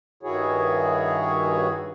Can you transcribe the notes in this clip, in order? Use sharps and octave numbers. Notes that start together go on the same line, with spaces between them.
G2 D#3 E4 F#4 G#4 C#5